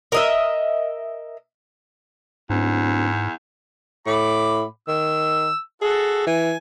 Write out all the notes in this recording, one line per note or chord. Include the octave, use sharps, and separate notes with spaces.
A#4 D#5 E5
D1 E2 G#2
A2 B5 D6
D#3 E6
F#4 G#4 A4
E3 G#5